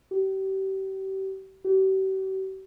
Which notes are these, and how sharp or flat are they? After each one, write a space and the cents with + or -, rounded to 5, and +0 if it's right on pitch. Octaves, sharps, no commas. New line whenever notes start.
G4 -35
G4 -45